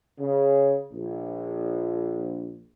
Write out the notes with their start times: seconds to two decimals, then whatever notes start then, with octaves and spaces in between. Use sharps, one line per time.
0.18 C#3
0.93 A#1